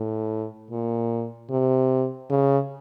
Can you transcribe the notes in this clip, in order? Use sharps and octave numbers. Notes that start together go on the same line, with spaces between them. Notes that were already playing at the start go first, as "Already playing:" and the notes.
Already playing: A2
A#2
C3
C#3